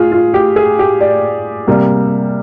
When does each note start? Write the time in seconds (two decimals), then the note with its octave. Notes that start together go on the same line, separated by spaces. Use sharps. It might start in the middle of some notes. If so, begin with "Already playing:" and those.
Already playing: F4 G#4
0.11 F4
0.34 G4
0.56 G#4
0.79 G4
1.01 D5
1.67 C3 G3 A#3